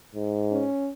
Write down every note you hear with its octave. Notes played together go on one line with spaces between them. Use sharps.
G#2
C#4